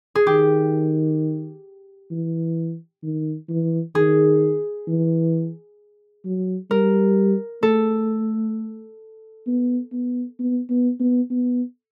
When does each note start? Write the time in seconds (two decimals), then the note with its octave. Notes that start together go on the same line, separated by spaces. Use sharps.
0.15 G#4
0.27 D#3 G4
2.11 E3
3.03 D#3
3.49 E3
3.95 D#3 G#4
4.87 E3
6.25 F#3
6.71 G3 A#4
7.63 A3 A4
9.47 B3
9.92 B3
10.39 B3
10.70 B3
11.00 B3
11.30 B3